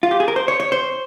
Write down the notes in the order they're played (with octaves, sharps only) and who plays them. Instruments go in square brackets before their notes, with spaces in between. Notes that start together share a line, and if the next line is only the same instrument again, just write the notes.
[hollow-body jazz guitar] F4
G4
G#4
A#4
C5
C#5
C#5
C5